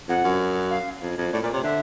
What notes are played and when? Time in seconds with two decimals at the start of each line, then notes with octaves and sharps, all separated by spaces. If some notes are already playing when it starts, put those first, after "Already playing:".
0.09 F2 F#5
0.24 F#2
0.71 F5
1.02 F2
1.18 F2
1.33 A2 D5
1.43 A#2 D5
1.53 C3 C#5
1.64 D3 E5